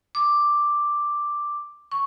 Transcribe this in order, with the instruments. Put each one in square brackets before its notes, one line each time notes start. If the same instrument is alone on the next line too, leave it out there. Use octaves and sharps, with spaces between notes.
[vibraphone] D6
C#6